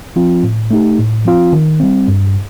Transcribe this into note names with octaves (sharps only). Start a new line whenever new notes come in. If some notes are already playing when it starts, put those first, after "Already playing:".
F3 C4 F4
A2
A3 D#4 G4
A2
F3 C4 F4
D#3
G3 C4
G2